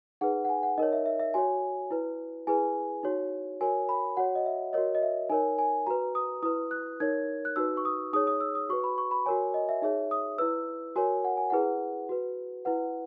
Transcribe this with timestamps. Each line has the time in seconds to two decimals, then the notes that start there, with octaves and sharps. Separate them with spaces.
0.21 D#4 G#4 B4 F#5
0.45 F#5
0.49 G#5
0.63 F#5
0.78 D#4 A#4 C#5 D#5
0.92 E5
1.06 E5
1.20 E5
1.34 F#4 C#5 G#5
1.91 E4 B4
2.47 E4 G#4 B4 G#5
3.03 D#4 F#4 C#5
3.61 F#4 A#4 C#5 G#5
3.89 B5
4.17 F#4 C#5 F#5
4.35 D#5
4.46 E5
4.73 F#4 A#4 C#5 D#5
4.95 D#5
5.02 E5
5.29 D#4 A#4 C#5 G#5
5.58 G#5
5.86 F#4 B4 A#5
6.15 D#6
6.43 E4 B4 D#6
6.71 F#6
7.00 D#4 A#4 C#5 G#6
7.45 F#6
7.56 D#4 F#4 B4 E6
7.77 C#6
7.85 D#6
8.13 D#4 G#4 C#5 D#6
8.27 D#6
8.41 E6
8.55 D#6
8.69 F#4 C#6
8.73 B4
8.84 B5
8.98 C#6
9.11 B5
9.26 F#4 A#4 C#5 G#5
9.54 D#5
9.69 E5
9.82 D#4 G#4 C#5 E5
10.11 D#6
10.38 E4 B4 E6
10.96 F#4 A#4 C#5 G#5
11.24 F#5
11.37 G#5
11.50 E4 G#4 B4 F#5
12.09 F#4 B4
12.65 E4 B4 F#5